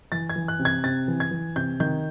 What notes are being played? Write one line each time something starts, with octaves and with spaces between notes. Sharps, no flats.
E3 A6
G#6
E3
F#6
C3
G#6
C3 A6
E3
G#6
E3
C3 G6
D#3 G6